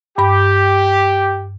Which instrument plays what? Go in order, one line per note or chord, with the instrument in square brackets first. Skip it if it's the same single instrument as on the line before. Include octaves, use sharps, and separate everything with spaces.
[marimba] G2 B5 [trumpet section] G4